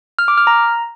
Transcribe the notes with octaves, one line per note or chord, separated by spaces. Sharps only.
F6
D6
F6
A#5